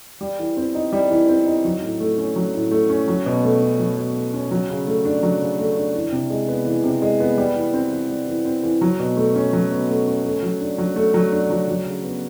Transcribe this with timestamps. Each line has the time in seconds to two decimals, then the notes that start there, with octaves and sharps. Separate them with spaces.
0.21 G3
0.39 E3
0.57 C4
0.75 D#4
0.92 G3
1.11 E3
1.29 C4
1.46 D#4
1.65 F#3
1.82 A2
2.00 A3
2.18 C#4
2.36 F#3
2.54 A2
2.71 A3
2.89 C#4
3.08 F#3
3.26 B2
3.43 A3
3.62 C#4
3.80 F#3
3.97 B2
4.15 A3
4.33 C#4
4.51 F#3
4.69 C#3
4.87 A3
5.05 D4
5.23 F#3
5.40 C#3
5.59 A3
5.76 D4
5.95 E3
6.12 C3
6.30 G#3
6.48 B3
6.66 E3
6.84 C3
7.02 G#3
7.20 B3
7.38 G3
7.56 E3
7.74 C4
7.92 E3
8.10 G3
8.27 E3
8.45 C4
8.63 E3
8.81 F#3
8.99 B2
9.17 A3
9.35 C#4
9.53 F#3
9.71 B2
9.89 A3
10.07 C#4
10.24 A3
10.42 F#3
10.61 D4
10.78 F#3
10.96 A3
11.14 F#3
11.32 D4
11.50 F#3
11.68 F#3
11.86 C#3
12.04 B3